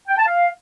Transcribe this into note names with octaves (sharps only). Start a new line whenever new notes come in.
G5
A5
F5